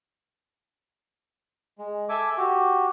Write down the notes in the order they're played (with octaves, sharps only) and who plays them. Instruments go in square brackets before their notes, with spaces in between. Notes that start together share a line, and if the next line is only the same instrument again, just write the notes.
[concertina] G#3
A4 E5 G#5 D6
F#4 G4